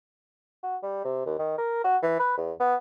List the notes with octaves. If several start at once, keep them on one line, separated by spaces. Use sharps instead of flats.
F#4
G3
C3
D#2
D#3
A#4
F#4
E3
B4
E2
B3